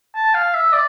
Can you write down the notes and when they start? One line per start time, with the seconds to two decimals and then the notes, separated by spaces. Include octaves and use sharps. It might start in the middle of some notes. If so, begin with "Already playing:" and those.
0.15 A5
0.34 F5
0.54 E5
0.73 D5